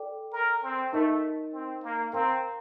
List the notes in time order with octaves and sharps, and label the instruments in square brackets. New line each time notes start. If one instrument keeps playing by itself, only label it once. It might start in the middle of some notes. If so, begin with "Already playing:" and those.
Already playing: [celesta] A4 D5 G5 D6
[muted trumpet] A#4
C4
[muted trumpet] A3 [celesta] D#4 A#4 D#5
[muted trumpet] C4
A#3
[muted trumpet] C4 [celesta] A#4 F5 A#5